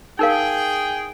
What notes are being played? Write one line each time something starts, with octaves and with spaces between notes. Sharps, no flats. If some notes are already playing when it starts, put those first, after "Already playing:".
D#4 G#4 A#4 F5 G5